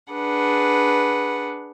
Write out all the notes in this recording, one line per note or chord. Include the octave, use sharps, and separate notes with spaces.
D4 G#4 B4 F#5